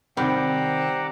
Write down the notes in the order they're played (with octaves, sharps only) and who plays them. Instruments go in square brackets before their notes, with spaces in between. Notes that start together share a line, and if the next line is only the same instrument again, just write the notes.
[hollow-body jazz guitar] C3 D#3 [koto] G3 [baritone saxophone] C4 [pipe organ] F#5 A#5 D6